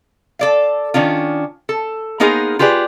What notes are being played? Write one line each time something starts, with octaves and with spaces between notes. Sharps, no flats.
A4 D5 F5
D#3 C#4 D4 F4
A4
A#3 B3 D#4 G#4 A#4 C5
F4 G4 G#4 B4 D5